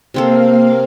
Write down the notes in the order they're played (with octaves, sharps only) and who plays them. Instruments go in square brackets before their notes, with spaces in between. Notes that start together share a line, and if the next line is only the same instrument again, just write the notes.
[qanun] C3 C4 A4 [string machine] A#3 F5